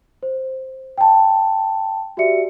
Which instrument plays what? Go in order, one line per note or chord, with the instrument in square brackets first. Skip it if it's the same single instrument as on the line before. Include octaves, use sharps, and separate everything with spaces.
[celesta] C5
G5 A5
F#4 G4 D5 E5 C#7